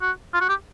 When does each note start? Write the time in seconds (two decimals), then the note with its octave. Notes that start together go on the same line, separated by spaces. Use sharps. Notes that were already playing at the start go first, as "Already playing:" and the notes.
0.01 F#4
0.34 F4
0.41 F#4
0.49 G4